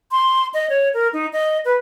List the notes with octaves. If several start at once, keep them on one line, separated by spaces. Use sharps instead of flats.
C6
D#5
C#5
A#4
D#4
D#5
B4